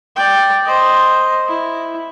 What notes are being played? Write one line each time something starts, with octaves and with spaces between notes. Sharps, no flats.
D5 G5
C5 D#5
E4